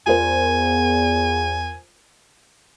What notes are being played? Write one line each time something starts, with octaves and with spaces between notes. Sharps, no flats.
E2 F4 A#4 C5 G#5